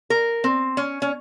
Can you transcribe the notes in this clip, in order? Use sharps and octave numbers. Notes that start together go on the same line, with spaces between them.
A#4
C4
C#4
C#4